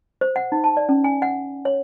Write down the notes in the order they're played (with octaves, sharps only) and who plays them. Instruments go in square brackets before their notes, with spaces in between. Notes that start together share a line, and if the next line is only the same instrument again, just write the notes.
[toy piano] C5
F#5
D#4
A5
D5
C#4
G#5
F#5
C#5